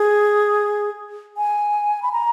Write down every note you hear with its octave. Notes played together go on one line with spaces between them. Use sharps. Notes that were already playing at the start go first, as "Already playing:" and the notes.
Already playing: G#4
G#5
B5
A#5